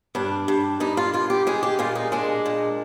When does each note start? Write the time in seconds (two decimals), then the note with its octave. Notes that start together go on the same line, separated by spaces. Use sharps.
0.15 G2 D4
0.48 G2
0.80 G2 D#4
0.97 F4
1.13 G2 F4
1.30 G4
1.47 G#3 G#4
1.63 G4
1.79 A#2 F4
1.95 D#4
2.12 G#3 D4
2.46 A#2